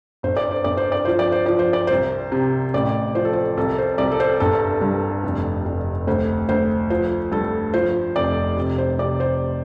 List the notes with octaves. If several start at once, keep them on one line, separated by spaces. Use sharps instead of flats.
G1 C5
D5
C5
G1 D5
C5
D5
F3 C5
D5
C5
F3 D5
C5
D5
C2 C5
C3
A1 D5
F3 C5
A4
C5
C2 A4
C5
C2 D5
A4
C5
G1 A4
G2
F1
F1
D2 C5
D2 C5
F3 C5
G2 A4
F3 C5
F1 D5
C3
C5
C3 D5
C5